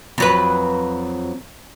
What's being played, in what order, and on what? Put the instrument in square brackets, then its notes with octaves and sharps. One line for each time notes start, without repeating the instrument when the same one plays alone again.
[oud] F2 F#3 B4